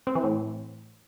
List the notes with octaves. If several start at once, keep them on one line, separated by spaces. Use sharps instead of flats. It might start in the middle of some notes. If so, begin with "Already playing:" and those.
C4
E3
A2